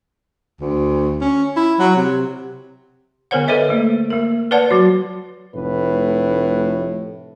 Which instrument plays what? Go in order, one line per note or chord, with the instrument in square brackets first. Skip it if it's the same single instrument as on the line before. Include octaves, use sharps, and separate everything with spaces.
[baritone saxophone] D2
C#4
E4
F#3
C3
[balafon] D3 B3 A#4 C5 C#5 F#5
A4 B4 C5 D#5 E5
A3 A#3
A#3 A#4
B4 C#5 D5 F#5 A5
F#3 F#4
[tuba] F1 [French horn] A2 [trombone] B4